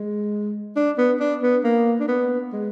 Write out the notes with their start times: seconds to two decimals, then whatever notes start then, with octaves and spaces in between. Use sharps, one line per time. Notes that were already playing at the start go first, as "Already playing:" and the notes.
Already playing: G#3
0.76 D4
0.98 B3
1.20 D4
1.43 B3
1.64 A#3
2.00 D4
2.08 B3
2.53 G#3